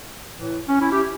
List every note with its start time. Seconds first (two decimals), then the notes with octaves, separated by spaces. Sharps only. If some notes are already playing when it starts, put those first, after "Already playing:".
0.33 A2 E3
0.68 C#4
0.80 C#4 E4
0.92 E4 G4